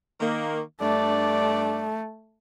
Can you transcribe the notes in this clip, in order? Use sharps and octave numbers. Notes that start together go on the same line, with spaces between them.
D#3 A#3
G2 A3 D4 D5